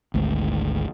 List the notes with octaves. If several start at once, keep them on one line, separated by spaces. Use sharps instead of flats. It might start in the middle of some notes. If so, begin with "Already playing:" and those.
G#1 D2 G#2